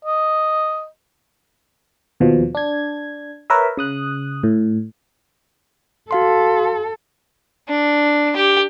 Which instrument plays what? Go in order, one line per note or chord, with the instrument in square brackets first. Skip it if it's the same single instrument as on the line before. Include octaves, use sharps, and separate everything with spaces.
[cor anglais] D#5
[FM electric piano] D#2 B2 F3
D4 G#6
A#4 B4 C#5 E5
C#3 D#6 F#6
A2
[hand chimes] F#4 F5 C6 [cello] A4
[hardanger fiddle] D4
G4